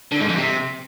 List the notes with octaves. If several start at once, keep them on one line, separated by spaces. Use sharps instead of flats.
D3
G#2
F2
C3